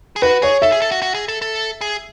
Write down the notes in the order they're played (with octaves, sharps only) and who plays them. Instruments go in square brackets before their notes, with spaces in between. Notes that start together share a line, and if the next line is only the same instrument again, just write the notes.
[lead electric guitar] G#4
[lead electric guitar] F#4 [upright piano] B4
[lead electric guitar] G#4 [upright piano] C#5
[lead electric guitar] A4 [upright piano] E5
[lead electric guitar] G#4
A4
F#4
F#4
G#4
A4
A4
G#4